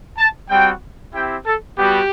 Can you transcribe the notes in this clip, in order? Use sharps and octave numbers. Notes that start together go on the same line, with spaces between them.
A5
G3 C4 F#4 G5
C4 E4 G4 G5
A4
G3 B3 F#4 G4